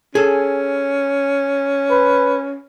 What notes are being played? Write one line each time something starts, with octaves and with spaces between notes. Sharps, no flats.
C#4 G#4 A4
B4